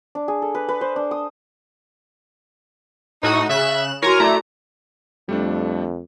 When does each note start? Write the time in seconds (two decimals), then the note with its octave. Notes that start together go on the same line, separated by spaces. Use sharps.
0.15 D4
0.28 G#4
0.42 A4
0.55 B4
0.69 B4
0.81 C5
0.96 D4
1.11 D#6
3.23 A2 D#4 F#4 D#6
3.50 C#3 E5 F#6 E7
4.02 E4 F#4 A#4 C#5 G#5 A#5
4.20 A3 E4 D5 A#5 D6
5.29 F2 G3 A3 D4